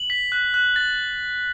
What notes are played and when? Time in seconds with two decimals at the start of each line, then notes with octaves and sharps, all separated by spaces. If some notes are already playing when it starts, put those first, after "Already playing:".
Already playing: F#7
0.10 B6
0.32 F#6
0.54 F#6
0.76 A6